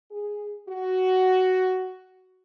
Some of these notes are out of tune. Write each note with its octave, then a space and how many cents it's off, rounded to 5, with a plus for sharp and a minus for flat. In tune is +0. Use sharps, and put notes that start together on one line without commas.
G#4 -5
F#4 +10